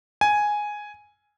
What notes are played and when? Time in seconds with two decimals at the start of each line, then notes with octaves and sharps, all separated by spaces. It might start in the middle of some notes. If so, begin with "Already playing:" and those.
0.21 G#5